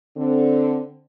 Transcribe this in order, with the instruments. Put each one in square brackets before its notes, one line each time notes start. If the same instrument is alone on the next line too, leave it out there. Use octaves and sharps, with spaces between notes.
[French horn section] D3 C4